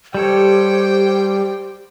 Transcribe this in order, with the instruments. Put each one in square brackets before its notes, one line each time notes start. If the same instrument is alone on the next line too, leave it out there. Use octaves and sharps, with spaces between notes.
[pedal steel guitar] G3 A4 C#5 [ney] G4 [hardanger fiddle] C5 G5